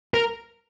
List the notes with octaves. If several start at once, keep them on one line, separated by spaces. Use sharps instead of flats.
A#4